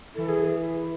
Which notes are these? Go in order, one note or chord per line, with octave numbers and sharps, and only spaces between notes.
E3 A4
G#4